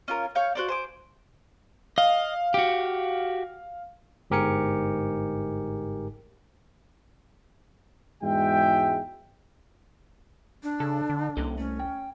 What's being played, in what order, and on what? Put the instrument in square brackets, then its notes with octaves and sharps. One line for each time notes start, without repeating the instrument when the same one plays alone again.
[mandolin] C#4 F4 A#4
C#5 F5 G6
F#4 C5 D5
C5 G#5 D6
[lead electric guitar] D#5 [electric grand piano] F5
[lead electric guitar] F#4 G4
[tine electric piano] G1 G#2 G4 A#4 G#5 C#7
[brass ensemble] E2 G#2 G#3 F#4 E5 G5
[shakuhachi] D4
[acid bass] C#3 [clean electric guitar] A4
[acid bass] D3
[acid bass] C2 [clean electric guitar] A#3 C#4 A4
[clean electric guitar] A3 [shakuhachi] C#4
[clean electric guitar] G5